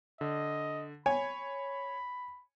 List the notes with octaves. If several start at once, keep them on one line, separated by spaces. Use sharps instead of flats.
D3 D#5
C#5 G#5 B5